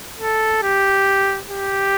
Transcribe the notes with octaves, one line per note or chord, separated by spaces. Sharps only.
A4
G4
G4